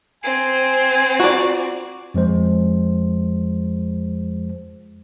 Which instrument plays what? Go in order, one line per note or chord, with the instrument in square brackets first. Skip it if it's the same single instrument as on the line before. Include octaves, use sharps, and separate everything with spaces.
[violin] C4 [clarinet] G#5
[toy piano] F4 C#6 [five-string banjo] F#4 D5
[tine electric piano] F2 F3 G#3 C5